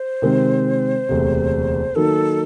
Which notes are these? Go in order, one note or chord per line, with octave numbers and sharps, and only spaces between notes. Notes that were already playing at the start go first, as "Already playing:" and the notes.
Already playing: C5
C3 D#3 G#3 C4
E1 D2 C3
D#3 F#3 A#3 D#4 A4